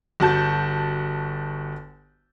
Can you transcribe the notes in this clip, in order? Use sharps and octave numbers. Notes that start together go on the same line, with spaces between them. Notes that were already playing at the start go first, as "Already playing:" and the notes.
G1 F#4 A5 G6